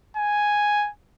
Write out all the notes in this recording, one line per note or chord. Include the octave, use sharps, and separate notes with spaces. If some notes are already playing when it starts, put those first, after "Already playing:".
G#5